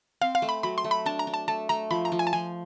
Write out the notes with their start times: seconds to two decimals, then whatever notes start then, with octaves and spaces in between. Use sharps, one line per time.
0.21 C4 F5
0.35 F5
0.42 A3
0.49 B5
0.63 F#3 B5
0.78 C6
0.84 A3
0.91 B5
1.06 D4 A5
1.19 A#5
1.27 D4
1.34 A5
1.48 A3 A5
1.69 A3 A#5
1.90 F3 B5
2.05 A#5
2.12 F3
2.19 G#5
2.27 A5
2.33 F3 G#5